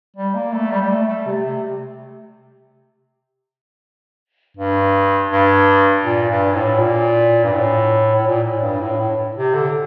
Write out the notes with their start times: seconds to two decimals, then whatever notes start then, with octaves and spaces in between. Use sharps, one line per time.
0.16 G3
0.35 A#3
0.52 A3
0.71 G3
0.82 G3
0.90 A3
1.08 A3
1.26 C3
1.45 C3
4.57 G2
5.31 G2
6.04 A#2
6.30 G2
6.55 A2
6.79 A#2
7.44 G2
7.53 A2
8.15 A2
8.26 A#2
8.44 A2
8.62 G2
8.81 A2
9.00 A2
9.36 C3
9.54 D3